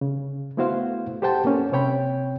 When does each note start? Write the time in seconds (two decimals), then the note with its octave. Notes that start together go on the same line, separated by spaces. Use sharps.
0.01 C#3
0.57 A3 B3 E4 F#4 C5 F5
1.22 G4 A4 C5 F#5 G5 A5
1.45 A#3 C#4
1.72 C3 C4 C#5 G5 B5